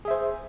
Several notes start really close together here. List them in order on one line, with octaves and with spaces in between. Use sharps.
G#4 E5 C5